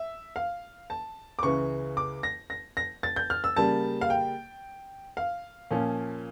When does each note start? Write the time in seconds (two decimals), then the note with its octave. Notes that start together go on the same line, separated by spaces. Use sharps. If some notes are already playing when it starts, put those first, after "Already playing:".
Already playing: E5
0.36 F5
0.90 A5
1.39 D6
1.43 C#2 C#3 E3 C#6
1.97 D6
2.23 A#6
2.50 A#6
2.77 A#6
3.03 A6
3.16 G6
3.30 F6
3.44 E6
3.56 C#3 G3 A#3 A5
4.01 F5
4.10 G5
5.17 F5
5.71 A#2 F3 C#4